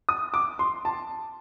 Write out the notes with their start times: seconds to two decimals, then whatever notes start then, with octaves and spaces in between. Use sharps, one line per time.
0.09 D#6
0.34 D6
0.59 C6
0.85 A5